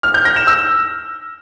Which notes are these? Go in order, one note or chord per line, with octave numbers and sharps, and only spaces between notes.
F6
G6
A#6
E7
E6